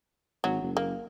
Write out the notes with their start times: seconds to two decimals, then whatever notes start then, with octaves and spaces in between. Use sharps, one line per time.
0.44 G#1 F#3
0.62 F#1
0.77 A#3